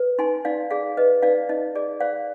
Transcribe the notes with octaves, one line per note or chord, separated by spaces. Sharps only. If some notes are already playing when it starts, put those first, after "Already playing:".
Already playing: B4
D#4 G#5 C6
D#4 D5 F5
G#4 D5 F5
B4 D#5
D#4 D5 F5
D#4 D#5
G#4 D5
C5 D5 F5